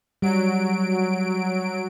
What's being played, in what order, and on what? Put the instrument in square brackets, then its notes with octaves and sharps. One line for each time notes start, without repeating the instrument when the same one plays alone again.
[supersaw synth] F#3 D7 [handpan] G3